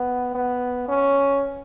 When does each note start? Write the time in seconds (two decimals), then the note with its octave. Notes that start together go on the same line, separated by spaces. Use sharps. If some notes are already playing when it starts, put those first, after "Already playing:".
Already playing: B3
0.34 B3
0.88 C#4